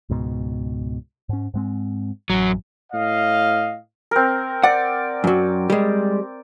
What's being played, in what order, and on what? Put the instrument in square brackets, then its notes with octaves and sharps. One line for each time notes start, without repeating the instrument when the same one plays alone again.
[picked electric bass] C#2 G#2 B2
G#2 C#4
G#2 G#3 C4
[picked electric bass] A1 [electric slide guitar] F#2 F#3
[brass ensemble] A2 D#5 F5
[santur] C4 A#4
[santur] D5 [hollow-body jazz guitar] F#5
[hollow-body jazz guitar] F#2 F#3
G3 G#3